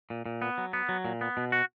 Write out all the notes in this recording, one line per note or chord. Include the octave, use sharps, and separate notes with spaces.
A#2
A#2
B3
F#3
B3
F#3
A#2
B3
B2
F#4